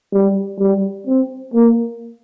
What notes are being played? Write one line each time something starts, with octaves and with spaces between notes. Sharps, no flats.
G3
G3
C4
A#3